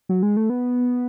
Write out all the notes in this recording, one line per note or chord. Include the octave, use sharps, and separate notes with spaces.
F#3
G#3
A3
B3